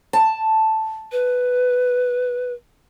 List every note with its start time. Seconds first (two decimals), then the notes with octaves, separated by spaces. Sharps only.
0.13 A5
1.12 B4